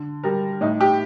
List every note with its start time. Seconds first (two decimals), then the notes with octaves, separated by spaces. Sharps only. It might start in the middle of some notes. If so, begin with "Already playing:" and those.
Already playing: D3
0.24 G3 A#4
0.61 A2 D#4
0.81 G4